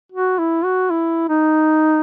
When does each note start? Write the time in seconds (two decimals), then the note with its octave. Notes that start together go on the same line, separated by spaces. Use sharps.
0.12 F#4
0.38 E4
0.64 F#4
0.90 E4
1.29 D#4